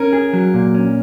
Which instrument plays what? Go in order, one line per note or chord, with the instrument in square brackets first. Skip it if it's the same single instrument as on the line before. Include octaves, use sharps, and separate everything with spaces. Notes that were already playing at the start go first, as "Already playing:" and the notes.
Already playing: [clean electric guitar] C#4 [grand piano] A#4
[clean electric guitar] G#4
F#3
A#2
C#4